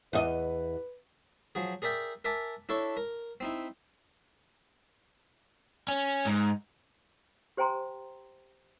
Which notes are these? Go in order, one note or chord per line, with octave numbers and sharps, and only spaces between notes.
E2 B4 D#5
F3 F#3 G#4
G#4 A#4 D5 E5 G5
A#4 E5 G#5 A5 D6
D4 E4 A4 C#5 C#6
A#4
C4 D#4 E4
C#4
G#2
G4 C5 G5 G#5 A#5 C6